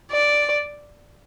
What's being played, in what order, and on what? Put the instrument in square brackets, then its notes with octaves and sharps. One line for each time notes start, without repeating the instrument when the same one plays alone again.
[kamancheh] D5